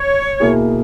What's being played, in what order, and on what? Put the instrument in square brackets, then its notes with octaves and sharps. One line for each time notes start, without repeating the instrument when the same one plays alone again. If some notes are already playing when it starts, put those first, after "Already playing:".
Already playing: [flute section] C#5
[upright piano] B2 A#3 E4 G#4